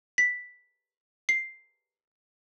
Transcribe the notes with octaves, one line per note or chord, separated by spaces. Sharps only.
B6
C7